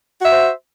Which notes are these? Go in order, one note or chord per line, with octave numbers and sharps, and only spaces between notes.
F#4 C5 E5